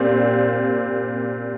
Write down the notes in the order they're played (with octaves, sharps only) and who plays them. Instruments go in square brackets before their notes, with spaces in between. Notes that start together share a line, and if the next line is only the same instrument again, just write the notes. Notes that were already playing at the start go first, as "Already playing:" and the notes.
Already playing: [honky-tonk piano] A#2 C4 G4